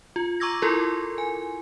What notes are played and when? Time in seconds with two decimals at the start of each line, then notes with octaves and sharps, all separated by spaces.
0.16 F4
0.40 A#5 C#6 D6 E6 G#6 A#6
0.62 E4 F4 A4 A#4 C6
1.18 G#5